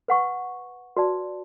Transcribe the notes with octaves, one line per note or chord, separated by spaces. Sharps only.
B4 F#5 C#6
F#4 B4 D5 A5